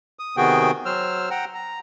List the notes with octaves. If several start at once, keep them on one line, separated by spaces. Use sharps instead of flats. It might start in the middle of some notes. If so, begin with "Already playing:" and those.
D#6
C3 D#3 B3 F#4 G#4 G5
F#3 C5 E6 F6
F#5 G5 A#5
A#5